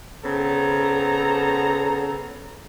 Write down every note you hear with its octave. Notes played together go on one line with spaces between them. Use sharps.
C#3 B3 C4 A4 A#5